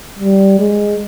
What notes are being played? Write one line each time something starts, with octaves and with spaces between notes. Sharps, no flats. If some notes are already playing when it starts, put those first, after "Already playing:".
G3
G#3